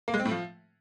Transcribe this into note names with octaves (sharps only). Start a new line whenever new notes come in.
A#3
G#3
C4
A2
F3